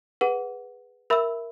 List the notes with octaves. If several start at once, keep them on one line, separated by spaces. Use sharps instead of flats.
G#4 B4 F#5
A#4 E5 B5 E6